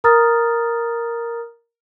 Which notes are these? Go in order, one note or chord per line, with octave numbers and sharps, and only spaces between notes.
A#4 A#5 D#6 F6 A6